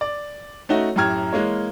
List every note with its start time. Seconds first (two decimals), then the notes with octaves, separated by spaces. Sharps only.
0.01 D5
0.69 A3 C#4 D#4 F#4
0.96 F#2 A2 G4 A#5 F6 G#6
1.33 E3 G#3 A#3 C#5